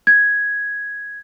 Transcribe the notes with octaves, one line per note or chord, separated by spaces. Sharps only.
G#6